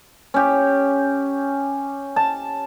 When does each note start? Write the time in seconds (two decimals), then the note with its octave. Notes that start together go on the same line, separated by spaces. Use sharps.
0.34 C#4 G4
2.16 A5